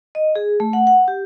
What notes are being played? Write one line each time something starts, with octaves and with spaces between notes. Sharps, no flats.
D#5
G#4
A3
F#5
F#5
G4